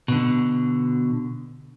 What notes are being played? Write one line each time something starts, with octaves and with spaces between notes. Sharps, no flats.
B2 D3